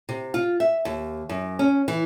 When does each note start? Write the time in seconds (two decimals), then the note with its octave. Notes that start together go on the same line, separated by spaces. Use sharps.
0.09 C3
0.34 F4
0.60 E5
0.85 D#2
1.29 F#2
1.59 C#4
1.88 E3